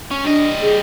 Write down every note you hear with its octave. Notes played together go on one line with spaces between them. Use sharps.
C#4
G3 D4 D#5
G#4